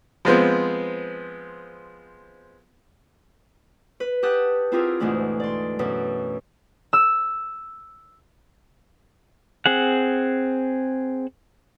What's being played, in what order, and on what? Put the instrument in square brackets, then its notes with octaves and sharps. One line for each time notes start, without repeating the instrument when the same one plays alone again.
[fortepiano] F3 G#3 B3 C4
[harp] B4
G4 F#5 A5 D#6 F#6
C4 E4 F4 G4 G#4 A#4
D2 G#2 B2 E3 A3 D4
D5 C6
F#2 B2 E3
E6
[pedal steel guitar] C4 G#4 F#5